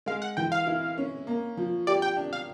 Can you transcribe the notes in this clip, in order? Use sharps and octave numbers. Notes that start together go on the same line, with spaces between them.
G#3 F5
F#5
E3 G5
F5
E4
C#4
A#3
F3
G4 D5
G5
D4
F5